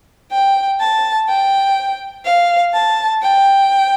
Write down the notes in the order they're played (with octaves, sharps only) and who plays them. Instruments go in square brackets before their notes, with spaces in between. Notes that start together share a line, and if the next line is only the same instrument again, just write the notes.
[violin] G5
A5
G5
F5
A5
G5